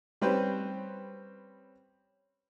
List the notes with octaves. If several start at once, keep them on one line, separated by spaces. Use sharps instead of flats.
G3 C4 C#4 B4 C5